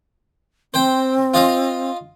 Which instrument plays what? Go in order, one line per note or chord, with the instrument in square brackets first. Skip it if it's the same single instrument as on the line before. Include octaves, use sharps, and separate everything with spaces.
[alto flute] C4 [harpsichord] C5 G5
[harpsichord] F4 D#5 F5